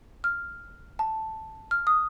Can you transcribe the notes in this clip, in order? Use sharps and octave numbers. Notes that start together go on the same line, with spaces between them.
F6
A5
F6
D#6